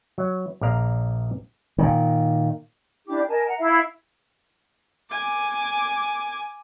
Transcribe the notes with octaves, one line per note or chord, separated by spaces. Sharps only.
F#3
A#1 D5 F5 A#5
A#2 D#3
D4 E4 G4 D6
A#4 D#5 G#5 A5
F#5 A#5
E4 E5 F5
G#5 D6